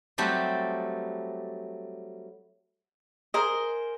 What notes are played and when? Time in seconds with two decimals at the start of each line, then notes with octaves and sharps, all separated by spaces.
0.18 F#3 G3 A3 C4 G4
3.34 G#4 A#4 C5 D#5